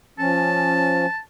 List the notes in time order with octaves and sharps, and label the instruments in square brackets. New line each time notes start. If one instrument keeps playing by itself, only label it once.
[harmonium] F3 C#4 [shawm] A5